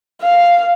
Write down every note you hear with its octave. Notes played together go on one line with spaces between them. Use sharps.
F5